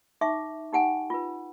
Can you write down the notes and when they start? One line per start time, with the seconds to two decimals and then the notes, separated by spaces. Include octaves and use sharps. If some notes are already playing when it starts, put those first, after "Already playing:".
0.21 D#4 E5 C#6 D6
0.73 D#4 G4 F#5 G#5
1.10 F4 B4